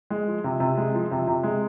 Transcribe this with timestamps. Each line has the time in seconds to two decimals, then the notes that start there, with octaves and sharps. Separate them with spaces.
0.11 G#3
0.27 F3
0.44 C3
0.60 C3
0.78 G#3
0.95 F3
1.11 C3
1.28 C3
1.43 G#3